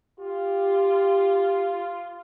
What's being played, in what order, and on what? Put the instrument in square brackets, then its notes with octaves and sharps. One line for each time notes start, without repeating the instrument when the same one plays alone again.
[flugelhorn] F4 [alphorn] G4